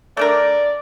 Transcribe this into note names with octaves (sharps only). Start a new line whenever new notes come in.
A3 D4 A#4 D5